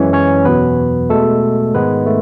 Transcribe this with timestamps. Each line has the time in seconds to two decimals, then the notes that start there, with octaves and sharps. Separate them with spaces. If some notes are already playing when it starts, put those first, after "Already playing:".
Already playing: F#2 E3 G#3 C#4 C#5
0.13 C#4 C#5
0.45 E2 B2 F#3 B3 B4
1.10 B2 G#3 A3 A4
1.74 G#2 D#3 G#3 B3 B4
2.06 A3